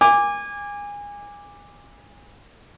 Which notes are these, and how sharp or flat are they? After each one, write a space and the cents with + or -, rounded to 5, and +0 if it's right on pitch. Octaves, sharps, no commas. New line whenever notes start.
G#5 -25 D6 +0